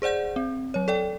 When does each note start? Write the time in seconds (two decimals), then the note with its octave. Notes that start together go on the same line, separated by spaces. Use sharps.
0.02 G#4 C5 D5 F#5 G6
0.36 C4
0.74 F#3 C#5
0.88 A4 D5 G5